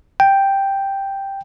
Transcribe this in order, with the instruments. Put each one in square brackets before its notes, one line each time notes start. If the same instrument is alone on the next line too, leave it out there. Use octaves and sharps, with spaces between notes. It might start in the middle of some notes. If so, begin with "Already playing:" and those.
[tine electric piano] G5